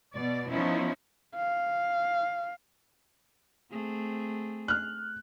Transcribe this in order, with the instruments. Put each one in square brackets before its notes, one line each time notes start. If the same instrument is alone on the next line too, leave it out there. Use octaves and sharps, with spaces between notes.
[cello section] B2 D5
F3 B3 C#4 D#4 E4
[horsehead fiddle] F5
[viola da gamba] A3 C4 G#4
[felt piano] F6 F#6